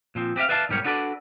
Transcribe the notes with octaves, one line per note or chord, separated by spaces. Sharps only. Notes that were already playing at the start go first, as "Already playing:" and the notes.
A#2 F3 C4
C4 G4 B4 E5 F5
B4 D5 E5 F5 G#5 A5
B1 G#2 G3 G4 A#4 C#5
B3 D4 F#4 A4 B4 D5